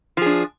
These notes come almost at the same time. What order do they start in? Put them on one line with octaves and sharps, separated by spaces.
F3 G#4 D4